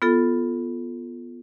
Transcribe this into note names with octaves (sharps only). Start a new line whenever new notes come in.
B3 F4 A4